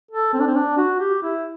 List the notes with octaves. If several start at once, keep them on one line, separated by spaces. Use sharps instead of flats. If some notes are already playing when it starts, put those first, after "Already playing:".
A4
C4
D4
C4
D4
F#4
G4
E4